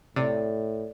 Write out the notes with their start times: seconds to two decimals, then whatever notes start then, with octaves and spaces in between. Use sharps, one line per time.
0.16 A2 C3 D5